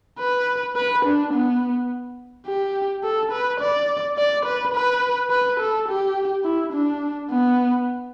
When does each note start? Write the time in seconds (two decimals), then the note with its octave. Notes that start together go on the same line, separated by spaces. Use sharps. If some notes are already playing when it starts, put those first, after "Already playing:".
0.19 B4
0.76 B4
1.05 D4
1.34 B3
2.46 G4
3.04 A4
3.32 B4
3.61 D5
4.18 D5
4.46 B4
4.74 B4
5.30 B4
5.60 A4
5.88 G4
6.44 E4
6.73 D4
7.30 B3